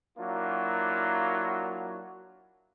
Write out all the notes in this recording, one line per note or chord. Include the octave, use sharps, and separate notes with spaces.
F#3 A#3 D4 E4 F4